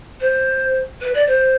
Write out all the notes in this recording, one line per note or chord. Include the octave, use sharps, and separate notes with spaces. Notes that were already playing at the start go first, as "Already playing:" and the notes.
C5
B4
D5
C5